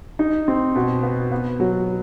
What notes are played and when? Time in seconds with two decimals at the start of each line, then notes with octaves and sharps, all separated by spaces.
0.19 D#4
0.48 C4
0.75 B2
1.03 B3
1.32 B3
1.60 F#3